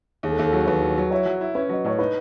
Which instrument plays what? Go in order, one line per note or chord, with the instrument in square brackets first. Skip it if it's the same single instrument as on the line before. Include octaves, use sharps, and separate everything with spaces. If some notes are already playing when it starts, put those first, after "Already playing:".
[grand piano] D#2 [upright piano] G#4
[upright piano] A4
[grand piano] D#2 [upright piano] G#4
[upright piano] A4
[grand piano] F#3 [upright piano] G#4
[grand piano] D#2 [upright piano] B4
[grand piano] F#3
F#3
[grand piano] E4 [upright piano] C#5
[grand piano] F#3
E4
[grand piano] C#4 [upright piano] B4
[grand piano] F#3 [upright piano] D#5
[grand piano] A2 [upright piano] C#5
[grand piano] D#4 [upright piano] B4